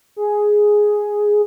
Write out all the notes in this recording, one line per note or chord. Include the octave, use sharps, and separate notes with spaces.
G#4